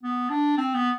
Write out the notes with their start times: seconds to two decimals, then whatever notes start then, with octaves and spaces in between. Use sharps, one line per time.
0.03 B3
0.30 D4
0.58 C4
0.75 B3